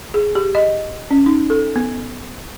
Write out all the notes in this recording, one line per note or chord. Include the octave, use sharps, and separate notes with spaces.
G#4
G4
D#5
C#4
D#4
A4
B3